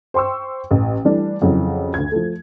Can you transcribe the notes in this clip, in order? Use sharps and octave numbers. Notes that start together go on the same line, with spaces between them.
C5 G5 C6 C#6 E6
A1
E3 G3 A3 D4
F2 C#3 E3 F#3
D2 G#6
F3 A3